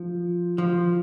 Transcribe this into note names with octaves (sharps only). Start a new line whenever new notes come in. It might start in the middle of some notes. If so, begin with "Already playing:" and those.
Already playing: F3
F3